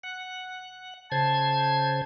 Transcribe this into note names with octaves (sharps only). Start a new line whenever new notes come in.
F#5
C#3 C5 A5 G#6